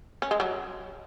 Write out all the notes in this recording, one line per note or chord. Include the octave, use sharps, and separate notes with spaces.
C#4
G#3
F#3